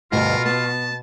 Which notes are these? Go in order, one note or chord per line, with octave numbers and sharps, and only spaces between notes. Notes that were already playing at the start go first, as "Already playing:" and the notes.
D2 G2 B2 F4 A#4 D#5
B3 A5